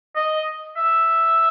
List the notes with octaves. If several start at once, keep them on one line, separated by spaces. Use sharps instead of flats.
D#5
E5